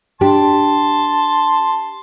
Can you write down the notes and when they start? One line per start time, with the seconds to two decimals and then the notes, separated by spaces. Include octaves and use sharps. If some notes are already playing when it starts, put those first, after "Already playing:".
0.21 D4 G4 A5 C6